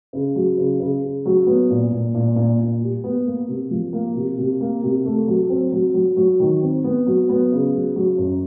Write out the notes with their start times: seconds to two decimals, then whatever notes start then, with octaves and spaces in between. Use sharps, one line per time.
0.13 C#3
0.35 F#3
0.58 C#3
0.80 C#3
1.02 C#3
1.26 F#3
1.47 B3
1.70 A#2
1.91 A#2
2.15 A#2
2.36 A#2
2.59 A#2
2.81 G3
3.04 B3
3.26 A#3
3.48 C3
3.71 F3
3.93 A#3
4.15 C3
4.38 C3
4.61 A#3
4.83 C3
5.05 A3
5.28 F#3
5.50 C4
5.72 F#3
5.94 F#3
6.17 F#3
6.40 D#3
6.62 C4
6.84 B3
7.06 F#3
7.29 B3
7.52 C#3
7.74 F#3
7.96 F#3
8.18 F#2